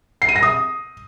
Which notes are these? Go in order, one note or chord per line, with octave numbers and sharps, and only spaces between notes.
C7
D#7
A#6
D#6